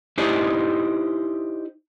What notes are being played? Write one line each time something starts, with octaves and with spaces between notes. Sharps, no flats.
D#4 E4 G4 C5 D5 D#5